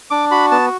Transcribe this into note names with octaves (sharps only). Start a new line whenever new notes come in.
D4 D6
F#4 B5
B3 A5